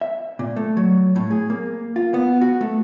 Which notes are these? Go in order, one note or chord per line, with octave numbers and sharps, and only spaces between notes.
E5
A#2
A3
F#3
A2
G#4
A#3
F4
B3
F#4
A3